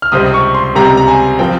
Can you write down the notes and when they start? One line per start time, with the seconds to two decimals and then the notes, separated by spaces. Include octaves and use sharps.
0.02 F6
0.12 C#2 C3 G3 C4 D#6
0.34 C#6
0.54 C6
0.75 C#2 C3 G3 C4 A#5
0.97 A#5
1.08 G#5
1.39 F3 C4 G5